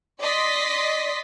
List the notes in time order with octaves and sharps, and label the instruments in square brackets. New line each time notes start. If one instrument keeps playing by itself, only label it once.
[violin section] D5 D#5 C6 A6 B6